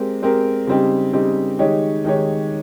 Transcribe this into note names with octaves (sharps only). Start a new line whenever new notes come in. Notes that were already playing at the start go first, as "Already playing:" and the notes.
Already playing: G#3 C4 G4 A#4
G#3 C4 G4 A#4
C#3 G3 C4 D#4 G4
C#3 G3 C4 D#4 G4
D#3 G#3 D#4 G4 C#5
D#3 G#3 D#4 G4 C#5